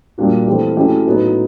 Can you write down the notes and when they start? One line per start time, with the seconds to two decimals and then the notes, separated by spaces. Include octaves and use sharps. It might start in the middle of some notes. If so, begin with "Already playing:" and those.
0.18 A#2 G3 A#3 D4 F#4
0.47 E3 A3 C4 E4 G4
0.76 F#3 A3 C#4 E4 G4
1.06 A2 F#3 B3 D#4